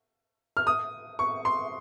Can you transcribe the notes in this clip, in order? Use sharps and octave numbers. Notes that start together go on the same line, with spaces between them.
F6
D#6
C#6
C6